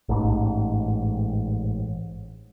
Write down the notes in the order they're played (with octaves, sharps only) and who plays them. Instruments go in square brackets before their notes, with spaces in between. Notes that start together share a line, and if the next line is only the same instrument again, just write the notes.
[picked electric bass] A1 G#2